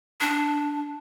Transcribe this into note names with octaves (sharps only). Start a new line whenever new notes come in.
D4